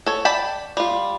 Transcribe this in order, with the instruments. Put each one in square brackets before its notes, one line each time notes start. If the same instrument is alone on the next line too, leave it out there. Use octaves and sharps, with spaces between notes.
[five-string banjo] A4 C#5
D5 G5 A5 B5
G3 F4